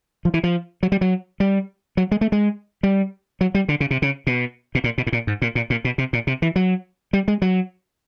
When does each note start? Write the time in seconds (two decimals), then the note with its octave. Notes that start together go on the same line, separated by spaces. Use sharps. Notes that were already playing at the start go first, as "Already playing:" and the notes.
0.25 F3
0.34 E3
0.44 F3
0.83 F#3
0.92 G3
1.01 F#3
1.40 G3
1.97 F#3
2.11 G#3
2.21 A3
2.32 G#3
2.83 G3
3.41 F#3
3.55 G3
3.69 D3
3.80 C#3
3.91 C3
4.02 C#3
4.27 B2
4.75 B2
4.84 A#2
4.98 B2
5.07 A2
5.12 A#2
5.27 G#2
5.42 A#2
5.55 A#2
5.70 A#2
5.85 B2
5.98 C3
6.13 A#2
6.27 C3
6.42 E3
6.56 F#3
7.13 G3
7.28 G#3
7.42 F#3